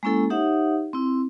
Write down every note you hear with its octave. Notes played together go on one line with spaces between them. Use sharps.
G#3 A#3 C#4 E4 A4
D#4 G4 C#5 E5 F#5
C4 E4